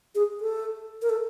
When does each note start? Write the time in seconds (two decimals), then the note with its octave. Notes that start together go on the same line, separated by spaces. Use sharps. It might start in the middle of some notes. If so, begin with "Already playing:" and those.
0.15 G#4
0.41 A4
1.02 A#4
1.10 A4